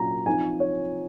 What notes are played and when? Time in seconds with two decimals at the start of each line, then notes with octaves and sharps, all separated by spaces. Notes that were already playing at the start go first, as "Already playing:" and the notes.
Already playing: A#2 F#3 C#4 A#5
0.26 F3 C4 D#4 G#5
0.60 C#5